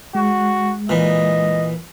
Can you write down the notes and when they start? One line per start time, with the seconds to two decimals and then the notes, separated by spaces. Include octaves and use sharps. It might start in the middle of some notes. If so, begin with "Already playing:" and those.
0.15 G#3 F#4
0.89 A#2 E3 D#5